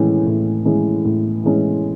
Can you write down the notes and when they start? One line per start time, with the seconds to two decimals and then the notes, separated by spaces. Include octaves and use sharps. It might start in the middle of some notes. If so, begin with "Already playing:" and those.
Already playing: A2 E3 G#3 C#4
0.27 A2
0.65 E3 G#3 C#4
1.05 A2
1.44 E3 G#3 C#4